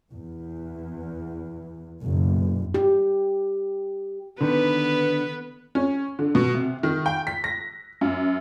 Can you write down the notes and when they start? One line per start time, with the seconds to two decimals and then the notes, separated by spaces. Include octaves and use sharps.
0.12 E2
2.02 F#1 B1
2.74 G4
4.41 D3 D#3 B3 B4
5.75 C#4
6.19 D3
6.35 B2
6.55 C3
6.83 D#3
7.06 G5
7.27 B6
7.44 A#6
8.01 F#2